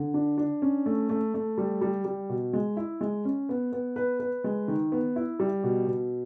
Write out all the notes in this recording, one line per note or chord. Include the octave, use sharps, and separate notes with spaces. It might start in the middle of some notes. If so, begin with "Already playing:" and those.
Already playing: D3
D4
D4
C#4
A3
A3
A3
G3
G3
G3
B2
G#3
E4
G#3
C#4
B3
B3
B4
B4
G#3
D#3
B3
E4
G3
B2
B2